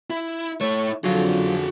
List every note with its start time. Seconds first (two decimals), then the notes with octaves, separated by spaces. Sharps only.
0.10 E4
0.61 A3 E4 C#5
1.04 F2 D3 F#3 F4 F#4 G#4